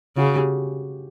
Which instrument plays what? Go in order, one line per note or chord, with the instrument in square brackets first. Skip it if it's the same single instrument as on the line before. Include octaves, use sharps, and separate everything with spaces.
[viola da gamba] C#3 [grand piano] F#4
[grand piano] G4